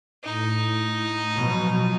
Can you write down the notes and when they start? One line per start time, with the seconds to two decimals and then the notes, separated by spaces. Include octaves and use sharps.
0.24 A2 D#4
1.34 B2 F3 F#3